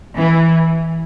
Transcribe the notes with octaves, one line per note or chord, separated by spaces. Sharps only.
E3